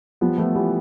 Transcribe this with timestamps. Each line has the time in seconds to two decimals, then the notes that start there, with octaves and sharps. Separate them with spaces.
0.21 F3 G3 B3
0.38 F3 A3 B3
0.55 E3 G3 B3